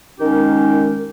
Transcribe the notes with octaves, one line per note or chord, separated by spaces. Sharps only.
D#3 G#3 C#4 D#4 G4 A#4